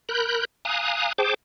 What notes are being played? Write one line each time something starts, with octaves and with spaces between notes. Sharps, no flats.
A#4 B5 F#6 G6
F5 G#5 A#5 D#6 F#6
G#4 C5 G5 A5 D6